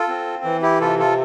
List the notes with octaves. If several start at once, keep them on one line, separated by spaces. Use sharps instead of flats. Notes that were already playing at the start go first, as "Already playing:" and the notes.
Already playing: F4 A4
C4
E3
E4 G4
C3 F4 A4
F4 A4